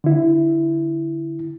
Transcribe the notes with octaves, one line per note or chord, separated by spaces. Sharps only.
D3 E4